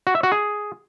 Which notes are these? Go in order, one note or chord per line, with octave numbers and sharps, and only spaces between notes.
F#4
E5
F#4
G#4